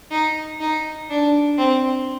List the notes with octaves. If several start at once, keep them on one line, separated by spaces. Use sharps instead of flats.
D#4
D#4
D4
C4